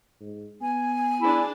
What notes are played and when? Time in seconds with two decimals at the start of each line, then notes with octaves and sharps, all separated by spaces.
0.21 G#2
0.61 B3 G#5
1.20 D4 E4 G#4